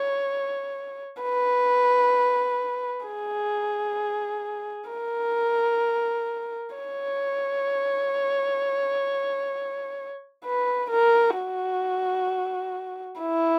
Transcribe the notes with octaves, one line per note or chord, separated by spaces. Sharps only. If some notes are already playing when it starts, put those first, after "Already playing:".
Already playing: C#5
B4
G#4
A#4
C#5
B4
A#4
F#4
E4